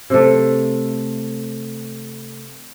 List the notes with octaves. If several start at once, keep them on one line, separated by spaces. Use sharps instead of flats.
C3 A3